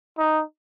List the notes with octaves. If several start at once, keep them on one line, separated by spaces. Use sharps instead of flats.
D#4